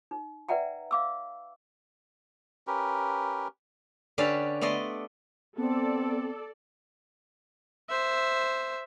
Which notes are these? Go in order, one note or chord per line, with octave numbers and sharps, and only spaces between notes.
D#4
B4 D5 E5 F#5 G5 A#5
F5 D6 E6
C#4 G4 A#4 B4
D3 C#4 G4 B4 D5 F5
A3 B3 D5 D#5 C6
B3 C4 A4 D5
C5 E5